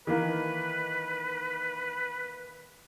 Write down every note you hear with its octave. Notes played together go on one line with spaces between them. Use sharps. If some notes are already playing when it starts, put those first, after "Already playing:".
D#3 E3 A#3 B4